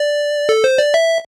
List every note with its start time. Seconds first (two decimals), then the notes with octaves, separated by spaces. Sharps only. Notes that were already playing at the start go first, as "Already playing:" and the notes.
Already playing: D5
0.49 A4
0.64 C5
0.78 D5
0.94 E5